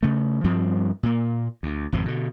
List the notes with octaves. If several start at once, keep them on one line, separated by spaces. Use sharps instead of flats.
C#3 A3
G2 F3 G3 C4
A#2 A#3
D2
G#1 F2 B2
B2 D3